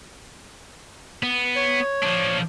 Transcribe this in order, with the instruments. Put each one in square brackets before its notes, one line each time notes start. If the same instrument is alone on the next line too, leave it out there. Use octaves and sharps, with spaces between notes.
[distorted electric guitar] B3
[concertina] C#5
[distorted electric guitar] F3 D4